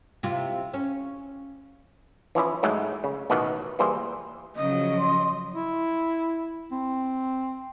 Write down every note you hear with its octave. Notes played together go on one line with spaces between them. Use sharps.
C3 E4 F4
C#4
E3 F3 C#4 E4
G#2 F#3 G#3 A3
C#3
A1 B2 D#3 E3 F#5
E3 G3 A#3 G#4 C5
C#3 F3 F#3 D#5
C6
E4
C4